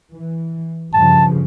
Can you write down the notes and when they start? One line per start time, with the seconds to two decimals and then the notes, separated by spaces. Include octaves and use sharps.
0.13 E3
0.93 G2 C#3 F3 A5